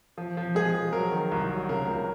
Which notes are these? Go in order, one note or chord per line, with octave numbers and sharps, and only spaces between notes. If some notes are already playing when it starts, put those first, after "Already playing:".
F3
F3
G#3 G#4
F3
F#3 A#4
D#3
C2
F#3
C#3 A#4
C#2